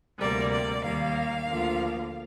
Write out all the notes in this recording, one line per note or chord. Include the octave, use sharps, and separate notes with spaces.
D2 C3 G3 A#3 D5
D5
D#2 D#3 G3 A#3 F5
D2 D3 F3 A#3